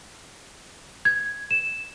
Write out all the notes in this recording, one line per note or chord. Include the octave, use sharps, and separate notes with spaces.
G#6
E7